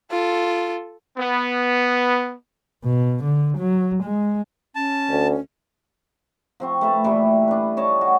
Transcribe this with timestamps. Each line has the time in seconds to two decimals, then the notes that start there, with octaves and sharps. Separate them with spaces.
0.11 F4 A4
1.18 B3
2.84 B2
3.24 D3
3.58 F#3
4.04 G#3
4.75 C#4 A5
5.09 D2
6.60 F3 C4 C#6
6.81 A3 B4 A5
7.04 A#2 E3 G3 A3
7.48 D4 B4
7.77 C#5 D#5 A5
8.01 F#4